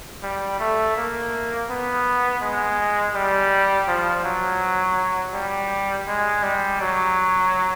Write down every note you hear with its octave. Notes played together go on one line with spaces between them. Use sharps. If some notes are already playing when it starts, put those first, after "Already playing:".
G3
A3
A#3
B3
G#3
G3
F3
F#3
G3
G#3
G3
F#3